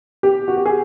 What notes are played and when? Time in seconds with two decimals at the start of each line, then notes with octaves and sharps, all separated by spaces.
0.23 G4
0.48 F#4
0.57 G4
0.66 G#4